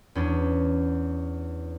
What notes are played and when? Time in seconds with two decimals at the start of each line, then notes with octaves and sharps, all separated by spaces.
0.15 E2 C#4 D4